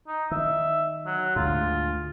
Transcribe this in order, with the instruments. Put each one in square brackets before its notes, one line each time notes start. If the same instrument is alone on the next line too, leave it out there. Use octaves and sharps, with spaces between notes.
[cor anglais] D#4
[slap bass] D#3 [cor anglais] E5
[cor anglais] F#3
[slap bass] D2 G#2 [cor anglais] F4